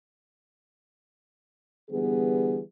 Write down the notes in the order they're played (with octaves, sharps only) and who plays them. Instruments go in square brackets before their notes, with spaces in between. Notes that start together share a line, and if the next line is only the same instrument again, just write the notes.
[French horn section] D3 E3 G3 B3 G#4